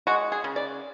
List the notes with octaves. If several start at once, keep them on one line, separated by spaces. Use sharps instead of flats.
G#3 F#4
G#4
C#3
D5